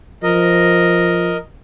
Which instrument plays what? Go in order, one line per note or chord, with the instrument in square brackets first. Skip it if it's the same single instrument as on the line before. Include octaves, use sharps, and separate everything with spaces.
[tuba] F3 [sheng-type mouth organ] A#4 D#5